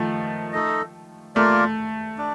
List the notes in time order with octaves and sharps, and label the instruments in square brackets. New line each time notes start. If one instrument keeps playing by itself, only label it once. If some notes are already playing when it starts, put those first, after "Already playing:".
Already playing: [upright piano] D#3 F3 A3
[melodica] A3 D#4 A4 D#5
[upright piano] A3 [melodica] A#3 F4 A#4 D5
[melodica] D4